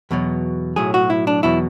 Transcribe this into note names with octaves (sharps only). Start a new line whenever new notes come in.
E2 B2 F#3
B1 A2 F#3 G#4
F#4
E4
D4
E2 B2 F#3 E4